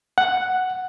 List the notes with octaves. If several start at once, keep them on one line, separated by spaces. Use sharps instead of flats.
F#5